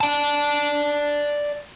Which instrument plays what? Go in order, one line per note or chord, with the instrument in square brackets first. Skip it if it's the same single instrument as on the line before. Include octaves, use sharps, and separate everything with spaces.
[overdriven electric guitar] D5 A5